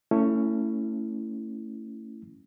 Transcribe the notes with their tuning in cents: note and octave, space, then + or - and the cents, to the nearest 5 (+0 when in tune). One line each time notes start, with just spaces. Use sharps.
A3 +25 C#4 +0 E4 +0